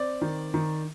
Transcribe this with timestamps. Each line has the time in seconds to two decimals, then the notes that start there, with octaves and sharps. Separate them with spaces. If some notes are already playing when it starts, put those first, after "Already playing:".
Already playing: C4 D5
0.21 D#3
0.54 D#3